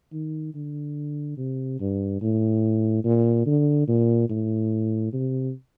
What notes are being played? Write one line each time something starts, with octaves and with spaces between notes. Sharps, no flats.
D#3
D3
C3
G2
A2
A#2
D3
A#2
A2
C3